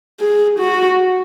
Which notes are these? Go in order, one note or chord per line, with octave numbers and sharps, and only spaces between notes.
G#4
F#4